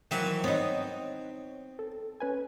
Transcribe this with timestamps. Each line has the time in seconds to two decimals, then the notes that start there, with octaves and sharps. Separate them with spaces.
0.11 D#3 E3 F#3 C4 E5
0.44 B3 C4 D#4 C#5
1.79 A4
2.20 C#4 B4 G#5